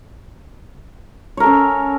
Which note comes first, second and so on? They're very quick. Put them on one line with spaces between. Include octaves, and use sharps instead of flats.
C#5 A#4 A4 C#4